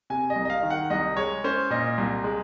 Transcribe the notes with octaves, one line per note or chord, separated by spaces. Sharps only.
C3 G#5
D#5
C2
D#5
F5
D#3
F#5
C2 D#5
G#3 C#5
C#4 C5
A#2 D#5
C2
G#3